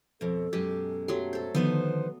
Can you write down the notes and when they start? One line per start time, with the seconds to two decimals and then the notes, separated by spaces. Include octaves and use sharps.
0.21 F2 B2 A4
0.53 F#2 B2 G#3 G4
1.08 F#3 A3 G4 C6
1.33 A4 C5
1.55 D3 D#3 F3 B3 D#4 B4 C5